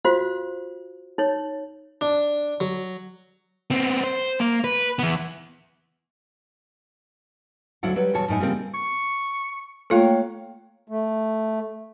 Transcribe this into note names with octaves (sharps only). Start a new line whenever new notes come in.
F4 F#4 C5 F5
D#4 C#5
D4
F#3
B3 C4
C5
A#3
B4
E3 B3
D2 F#3 D4 E4 F5 F#5
F#3 G3 B4
E2 B2 C#5 A5
F#2 A2 D#4 G#5
C#3 F3 G3 A#3 C4
C#6
A3 A#3 F4 A4 C#5 F5 G5
A3